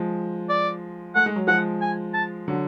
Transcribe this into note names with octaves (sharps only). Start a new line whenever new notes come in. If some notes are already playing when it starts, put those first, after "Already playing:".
Already playing: F3 G#3
D5
A3 F#5
G#3
F#3
F3 G#3 F#5
G#5
A5
D3 F#3